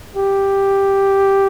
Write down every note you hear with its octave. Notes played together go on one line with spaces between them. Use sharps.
G4